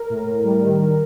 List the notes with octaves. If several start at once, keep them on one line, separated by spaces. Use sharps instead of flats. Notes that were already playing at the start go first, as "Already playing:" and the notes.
Already playing: A#4
A2
A2
G3
D#3
D#3